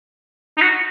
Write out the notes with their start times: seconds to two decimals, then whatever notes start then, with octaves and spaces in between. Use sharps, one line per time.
0.57 D#4
0.61 F#4